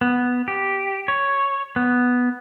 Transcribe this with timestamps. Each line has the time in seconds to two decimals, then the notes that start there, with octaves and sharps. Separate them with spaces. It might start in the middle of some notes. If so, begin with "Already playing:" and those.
0.01 B3
0.48 G4
1.08 C#5
1.76 B3